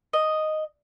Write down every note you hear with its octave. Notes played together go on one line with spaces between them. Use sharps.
D#5